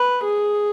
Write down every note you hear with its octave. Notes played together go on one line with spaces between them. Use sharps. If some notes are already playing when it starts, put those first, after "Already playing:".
Already playing: B4
G#4